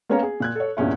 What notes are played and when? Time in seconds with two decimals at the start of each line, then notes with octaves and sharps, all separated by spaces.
0.09 A#3 B3 C#4 C#5 F5 A#5
0.23 G#4
0.40 A#2 F#6 G#6
0.55 A4 C#5
0.77 E2 G2 A#2 C#4 E4